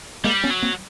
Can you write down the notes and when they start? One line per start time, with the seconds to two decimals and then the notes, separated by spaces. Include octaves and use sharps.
0.24 G3 G#3 A#3
0.44 B3 C#4
0.50 F#3
0.62 A#3 C4